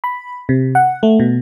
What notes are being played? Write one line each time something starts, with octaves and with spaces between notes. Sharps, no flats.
B5
C3
F#5
A3
B2